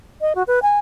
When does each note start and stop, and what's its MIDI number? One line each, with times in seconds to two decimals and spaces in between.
0.21 0.33 75
0.35 0.43 66
0.47 0.60 71
0.62 0.79 80